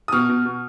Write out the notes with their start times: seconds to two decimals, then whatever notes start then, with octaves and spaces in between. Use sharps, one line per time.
0.08 D#6
0.12 B2 F6
0.29 B2
0.45 B2